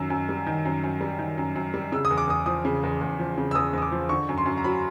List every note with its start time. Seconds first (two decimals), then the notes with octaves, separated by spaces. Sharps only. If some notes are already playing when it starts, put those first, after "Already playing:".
Already playing: F#2 D#3 E6
0.10 F#2
0.29 G3
0.46 D#3
0.65 F#2
0.84 F#2
1.01 G3
1.19 D#3
1.38 F#2
1.56 F#2
1.74 G3
1.92 C#3 E6
2.05 D#6
2.11 E2
2.18 D6
2.28 E2 D#6
2.46 F3 D#6
2.65 C#3
2.83 E2
3.01 E2
3.19 F3
3.38 C#3
3.51 E6
3.55 E2 D#6
3.73 E2 D#6
3.82 D6
3.92 F3
4.09 D3 C#6
4.29 F#2
4.38 C6
4.46 F#2
4.57 A#5
4.64 F#3 B5